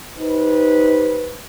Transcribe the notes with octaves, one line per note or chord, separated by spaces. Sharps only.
D#4 G4 B4 C5